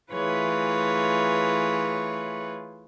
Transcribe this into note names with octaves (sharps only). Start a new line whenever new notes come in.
E3 A3 F4 G#4 B4 C#5